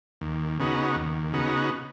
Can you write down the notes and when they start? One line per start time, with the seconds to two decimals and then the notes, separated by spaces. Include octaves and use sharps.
0.21 D#2
0.60 C#3 B3 D#4 F#4
0.95 D#2
1.33 C#3 B3 D#4 F#4